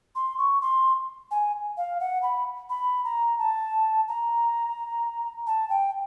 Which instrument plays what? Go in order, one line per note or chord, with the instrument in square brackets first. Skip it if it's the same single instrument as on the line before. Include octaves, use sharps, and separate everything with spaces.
[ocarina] C6
C#6
C6
G#5
F5
F#5
B5
B5
A#5
A5
A#5
A5
G5